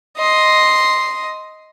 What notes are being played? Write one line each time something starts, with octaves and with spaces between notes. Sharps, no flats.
D#5 C6